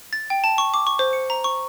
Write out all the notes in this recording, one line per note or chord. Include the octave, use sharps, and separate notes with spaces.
A6
G5
A5
C#6
D6
C#6
C5
C#7
A#5
C#6